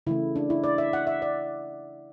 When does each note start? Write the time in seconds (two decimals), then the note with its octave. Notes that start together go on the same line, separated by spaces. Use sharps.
0.07 C#3 E3 A3 E4
0.36 D4
0.50 E4
0.64 D5
0.78 E5
0.93 F#5
1.07 E5
1.22 D5